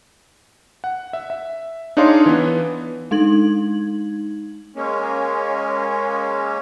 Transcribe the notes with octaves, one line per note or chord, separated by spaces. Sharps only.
F#5
E5
E5
D4 D#4 G#4 C#5 F5 C6
E3 B3
G#3 D#4 G#6 F#7
G#3 A#3 C#4